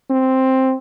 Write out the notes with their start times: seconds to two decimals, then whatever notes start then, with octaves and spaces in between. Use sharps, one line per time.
0.10 C4